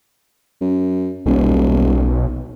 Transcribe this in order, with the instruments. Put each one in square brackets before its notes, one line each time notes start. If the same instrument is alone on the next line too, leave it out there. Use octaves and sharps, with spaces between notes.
[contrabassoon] F#2
[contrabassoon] D#1 [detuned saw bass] B1